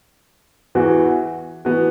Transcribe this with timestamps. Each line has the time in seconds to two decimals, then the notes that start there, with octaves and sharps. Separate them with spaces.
0.75 E2 E3 B3 F#4
1.65 E3 B3 F#4